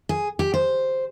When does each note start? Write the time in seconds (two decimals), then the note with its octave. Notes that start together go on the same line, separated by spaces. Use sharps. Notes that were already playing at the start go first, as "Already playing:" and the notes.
0.09 G#4
0.39 G4
0.54 C5